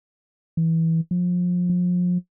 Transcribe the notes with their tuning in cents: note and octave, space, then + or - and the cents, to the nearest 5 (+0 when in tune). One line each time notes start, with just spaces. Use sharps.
E3 -15
F3 +30
F3 +35